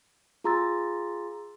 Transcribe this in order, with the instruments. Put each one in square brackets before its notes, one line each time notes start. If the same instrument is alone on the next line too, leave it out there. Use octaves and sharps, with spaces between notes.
[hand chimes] F4 G#4 A#5 C6 E6 A6